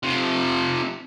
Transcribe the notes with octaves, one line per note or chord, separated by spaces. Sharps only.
C3 F3